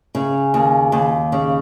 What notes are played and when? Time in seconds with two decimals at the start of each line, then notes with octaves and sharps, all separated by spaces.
0.15 C#3
0.54 D#2
0.92 D#2
1.32 C#3